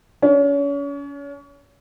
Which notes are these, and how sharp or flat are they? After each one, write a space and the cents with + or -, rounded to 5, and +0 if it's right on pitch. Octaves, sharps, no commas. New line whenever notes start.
C#4 +35